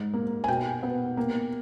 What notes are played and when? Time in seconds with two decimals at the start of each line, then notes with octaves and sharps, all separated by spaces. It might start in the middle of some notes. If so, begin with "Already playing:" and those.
Already playing: G#2
0.14 A#3
0.44 G#5
0.48 B2 G5
0.83 B3
1.17 A#3